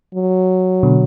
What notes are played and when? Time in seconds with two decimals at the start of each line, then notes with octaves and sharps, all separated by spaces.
0.15 F#3
0.83 B2 D3